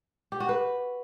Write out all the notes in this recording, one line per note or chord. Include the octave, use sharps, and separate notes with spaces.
G4
F#4
B4